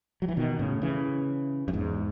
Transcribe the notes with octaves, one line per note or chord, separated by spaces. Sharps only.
F#3
E3
B2 D#3
A2 C#3
C#3 E3
F#2
E2 G#2